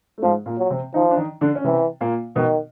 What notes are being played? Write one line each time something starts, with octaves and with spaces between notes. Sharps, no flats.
A3
G#2 F3 G#3
A#2 A#3
F#3
C3 C4
D#3 F3 D#4
D4
D#3 D#4
D3 D4
C#4
C3 E3 C4
A#2 A#3
B2 D#3 B3